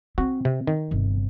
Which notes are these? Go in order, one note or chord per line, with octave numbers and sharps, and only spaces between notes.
C4 F#4
C3
D#3
G1 C3